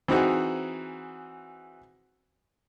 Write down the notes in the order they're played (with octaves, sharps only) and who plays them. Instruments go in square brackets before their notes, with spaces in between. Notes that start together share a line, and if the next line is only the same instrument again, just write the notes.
[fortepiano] E3 C4 D#4 F#4 G#4